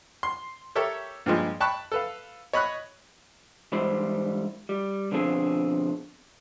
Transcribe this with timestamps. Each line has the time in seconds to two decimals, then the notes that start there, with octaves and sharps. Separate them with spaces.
0.23 C6
0.75 G4 A4 A#4 C#5 E5
1.26 G2 A#2 F3 G#3
1.60 G5 A5 B5 C#6 F#6
1.92 A4 B4 F5
2.53 C#5 D#5 B5 C#6 F#6
3.72 G#2 E3 G3 E4 C5 B5
4.69 G3
5.12 B2 D3 F3 C4 G#4